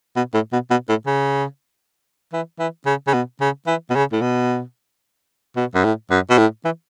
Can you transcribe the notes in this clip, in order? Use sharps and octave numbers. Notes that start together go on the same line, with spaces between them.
B2
A2
B2
B2
A2
C#3
E3
E3
C#3
C#3
B2
C#3
E3
B2
C#3
A2
B2
B2
F#2
A2
F#2
B2
A2
E3